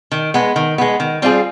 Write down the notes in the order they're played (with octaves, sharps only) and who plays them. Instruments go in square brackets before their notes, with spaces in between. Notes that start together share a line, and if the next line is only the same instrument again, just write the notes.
[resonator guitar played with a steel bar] D#3
G#3 B3
D#3
G#3 B3
D#3
G3 C4 F4 G#4